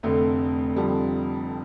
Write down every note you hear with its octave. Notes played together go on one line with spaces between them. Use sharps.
F1 F2 D3 A3
F1 F2 D3 F3 G3